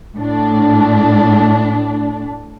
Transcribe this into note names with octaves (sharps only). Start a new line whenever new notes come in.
A2 D4